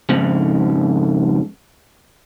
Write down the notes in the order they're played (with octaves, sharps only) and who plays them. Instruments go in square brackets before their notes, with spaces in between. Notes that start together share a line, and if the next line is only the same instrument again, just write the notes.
[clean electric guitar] F2 G#2 C#3